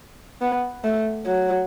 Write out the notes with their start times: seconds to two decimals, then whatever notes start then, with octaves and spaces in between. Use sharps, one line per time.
0.41 B3
0.84 A3
1.26 F#3